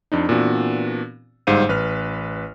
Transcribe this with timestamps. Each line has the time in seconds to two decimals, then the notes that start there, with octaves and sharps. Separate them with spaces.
0.12 F2 D4 D#4
0.29 A#2 E3 B3 C4 D4 F#4
1.47 G1 G#2 G3 C5 F5 D#7
1.69 A1 B4 F6